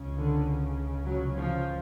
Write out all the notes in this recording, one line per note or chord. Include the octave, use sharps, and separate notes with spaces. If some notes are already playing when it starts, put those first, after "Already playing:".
Already playing: C#2 C#3
D3
F#3
F3